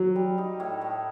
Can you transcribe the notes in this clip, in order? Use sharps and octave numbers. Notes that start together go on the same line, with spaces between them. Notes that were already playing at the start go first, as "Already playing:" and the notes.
Already playing: F#3
G3
D#4
A2
A2